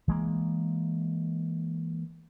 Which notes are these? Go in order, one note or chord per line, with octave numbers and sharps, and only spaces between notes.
E3 G#3 A#3